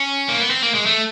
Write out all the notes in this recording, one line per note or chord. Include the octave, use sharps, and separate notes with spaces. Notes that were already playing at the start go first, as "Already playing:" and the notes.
Already playing: C#4
A#3
B3
C4
A#3
G#3
A3